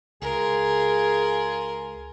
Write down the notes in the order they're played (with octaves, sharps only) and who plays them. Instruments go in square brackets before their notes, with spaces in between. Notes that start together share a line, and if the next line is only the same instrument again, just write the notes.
[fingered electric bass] C#2 [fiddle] F4 A#4 [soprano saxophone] G#4